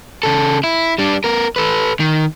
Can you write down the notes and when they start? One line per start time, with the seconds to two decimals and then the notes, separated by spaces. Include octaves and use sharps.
0.23 C#3 A4
0.64 E4
0.98 G3 D4
1.24 B3 A#4
1.56 A4 B4
2.00 D#3